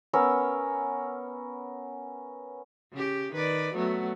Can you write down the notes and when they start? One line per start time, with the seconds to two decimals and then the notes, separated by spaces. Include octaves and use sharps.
0.13 B3 C#4 A#4 E6
2.93 C#3 G4
3.33 D#3 B4 D5
3.75 F#3 A3 B3